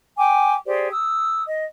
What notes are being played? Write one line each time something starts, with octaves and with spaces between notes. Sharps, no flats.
G5 G#5 D6
G4 G#4 C5 D5
D#6 E6
D#5